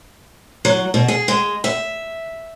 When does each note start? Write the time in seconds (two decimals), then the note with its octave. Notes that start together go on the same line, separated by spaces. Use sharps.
0.65 F#3
0.94 B2
1.08 G#4
1.28 G#3
1.64 E5